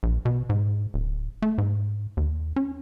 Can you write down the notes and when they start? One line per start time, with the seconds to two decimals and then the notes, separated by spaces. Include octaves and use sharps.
0.03 A#1
0.25 B2
0.49 G#2
0.94 D1
1.42 A3
1.58 G#2
2.17 D#2
2.56 C#4